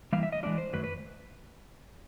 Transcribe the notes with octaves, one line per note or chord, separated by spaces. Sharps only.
E3 G3 A#3 E4 F5
E5
D#5
E3 G#3 B3 D4 F4 D5
C5
F#2 D#3 F#3 A3 B4
B4